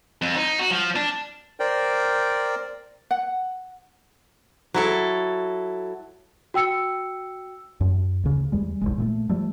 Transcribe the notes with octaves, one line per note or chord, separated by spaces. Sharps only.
F2
D#4
F#4
F3
D4
A#4 C5 D5 G5
F#5
F#3 E4 A4
F#4 G5 E6 C#7
F#2
D2 C#3
E2 G3 G#3
B1 F#2 G#3
A#2 F3 A3
F3 G3 A3